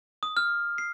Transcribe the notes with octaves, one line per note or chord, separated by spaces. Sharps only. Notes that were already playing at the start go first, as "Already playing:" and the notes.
D#6
F6
C7